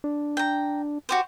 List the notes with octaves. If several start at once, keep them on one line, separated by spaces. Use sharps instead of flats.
D4
G5 A#5
F#4 G4 C5